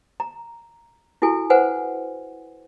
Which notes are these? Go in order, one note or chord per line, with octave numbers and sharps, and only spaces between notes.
A#5
E4 F#4 A4 G#5
B4 C5 F#5 G#5